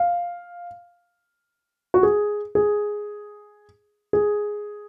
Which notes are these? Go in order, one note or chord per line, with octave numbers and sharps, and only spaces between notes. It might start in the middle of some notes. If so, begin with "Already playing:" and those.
Already playing: F5
F#4
G#4
G#4
G#4